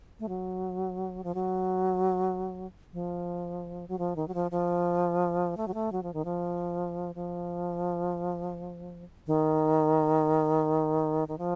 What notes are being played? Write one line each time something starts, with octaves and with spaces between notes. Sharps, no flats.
A3
F#3
F3
F#3
F3
F#3
F3
D#3
F#3
F3
F3
A3
F#3
A3
F#3
F3
D#3
F3
F3
D#3
D#3
F3